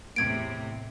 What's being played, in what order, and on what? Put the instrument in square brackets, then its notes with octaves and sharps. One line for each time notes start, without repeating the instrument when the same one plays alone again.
[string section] E2 A2 C3 [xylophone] G#6 D7